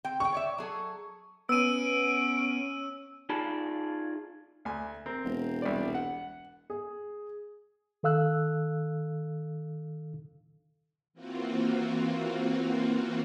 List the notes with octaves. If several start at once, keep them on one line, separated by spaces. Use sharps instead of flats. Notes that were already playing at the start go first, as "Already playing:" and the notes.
C4 G5
D4 G5 C#6
C#5 D5 E5
F#3 G#4 A4
B3 C#4 E6 D7 D#7
D#4 F4 G#4 D5 A5 B5
D2 G#5
C4 A#4
E1
C2 D5
F#5
G#4
D#3 A4 F5 E6 F#6
E3 A#3 C4 F4 F#4